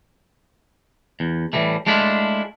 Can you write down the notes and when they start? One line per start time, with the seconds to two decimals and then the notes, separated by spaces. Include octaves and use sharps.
1.20 E2
1.53 A2 E3 F#3 G3 A3
1.87 G#3 A3 D4 E4 F4